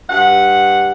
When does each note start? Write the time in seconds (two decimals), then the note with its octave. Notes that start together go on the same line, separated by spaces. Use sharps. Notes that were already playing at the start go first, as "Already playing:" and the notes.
0.10 G2 F#5